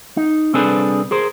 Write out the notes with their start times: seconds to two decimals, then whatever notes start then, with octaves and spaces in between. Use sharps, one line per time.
0.17 D#4
0.54 C2 C4 D4 G#4 A4 B4
1.11 G#4 A#4 C5